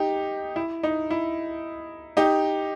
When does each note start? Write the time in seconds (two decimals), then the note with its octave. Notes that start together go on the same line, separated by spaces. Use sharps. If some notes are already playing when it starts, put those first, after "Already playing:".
Already playing: D#4 G4
0.56 E4
0.83 D#4
1.10 E4
2.17 D#4 G4